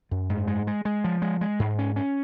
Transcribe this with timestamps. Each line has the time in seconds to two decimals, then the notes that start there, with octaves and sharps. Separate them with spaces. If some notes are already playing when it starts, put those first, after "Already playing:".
0.11 F#2
0.30 G#2
0.48 G#3
0.67 G#3
0.85 G#3
1.04 F3
1.22 G#3
1.41 G#3
1.59 G#2
1.79 C#4
1.96 C#4